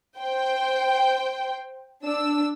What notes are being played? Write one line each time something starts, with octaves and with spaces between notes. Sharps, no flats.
C5 G5
D4 E6